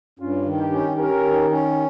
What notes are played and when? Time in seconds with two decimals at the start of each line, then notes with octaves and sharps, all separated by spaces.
0.20 G2 C#4 F4
0.46 D#3
0.59 D#4 G4
0.72 C#4
0.97 C#4 G4 A#4
1.24 D#3
1.51 C#4